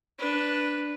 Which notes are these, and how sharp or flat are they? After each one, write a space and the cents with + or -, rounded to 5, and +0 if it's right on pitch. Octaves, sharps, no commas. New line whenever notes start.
D4 +0 B4 +0